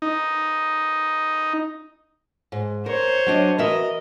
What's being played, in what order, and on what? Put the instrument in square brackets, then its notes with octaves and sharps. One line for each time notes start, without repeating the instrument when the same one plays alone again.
[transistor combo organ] D#4
[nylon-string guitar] G#2
[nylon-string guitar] A#4 [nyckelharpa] C5 C#5
[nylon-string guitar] F#3 D4 D#5
[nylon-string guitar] E3 F#4 E5 [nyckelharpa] A#4 D#5